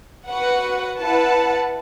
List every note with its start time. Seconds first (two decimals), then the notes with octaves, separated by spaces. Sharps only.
0.28 F#4 B4 F#5
0.97 E4 B4 F#5 A5